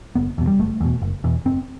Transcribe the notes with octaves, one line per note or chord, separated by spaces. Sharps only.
F#1 B3
E2 B2
G3
F#1 A3
E2 B2
F#1
E2 B2
F#1 C4